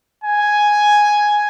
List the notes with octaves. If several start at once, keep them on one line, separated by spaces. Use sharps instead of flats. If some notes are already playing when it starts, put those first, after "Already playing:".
G#5